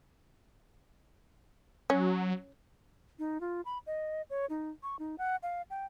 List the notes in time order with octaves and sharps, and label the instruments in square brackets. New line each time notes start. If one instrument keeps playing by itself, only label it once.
[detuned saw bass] F#3 [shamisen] C#4
[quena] D#4
F4
B5
D#5
C#5
D#4
C#6
D#4
F#5
F5
G5